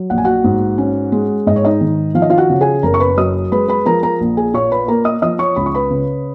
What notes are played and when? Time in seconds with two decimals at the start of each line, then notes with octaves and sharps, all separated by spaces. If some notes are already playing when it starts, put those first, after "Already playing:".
Already playing: F#3
0.10 A#1 F#5
0.18 G#5
0.25 F#4 F#5
0.44 G#2
0.78 C#4
1.12 G#3
1.46 G#2 D#5
1.56 C#5
1.65 D#4 D#5
1.81 D#3
2.15 F3 F5
2.22 D#5
2.30 F4 F5
2.38 F#4 F#5
2.50 C#3
2.61 G#4 G#5
2.83 F#1 A#4 A#5
2.94 C#6
3.00 B4 B5
3.17 F#2 D#5 D#6
3.52 G#3 B4 B5
3.68 B4 B5
3.86 F3 A#4 A#5
4.03 A#4 A#5
4.21 A#1
4.37 G#4 G#5
4.54 A#2 C#5 C#6
4.72 B4 B5
4.88 A#3 A#4 A#5
5.05 D#5 D#6
5.22 F3 D#5 D#6
5.39 C#5 C#6
5.56 C#2 B5
5.66 C#6
5.75 B4 B5
5.90 C#3